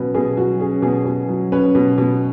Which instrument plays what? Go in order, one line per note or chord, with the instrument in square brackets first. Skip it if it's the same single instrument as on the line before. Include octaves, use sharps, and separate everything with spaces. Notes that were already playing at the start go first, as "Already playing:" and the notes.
Already playing: [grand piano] B2 F#3 C#4 B4
B2 G#4
F#3 F#4
C#4 G#4
B2 G#4
B2
F#3
C#4 B4
B2
B2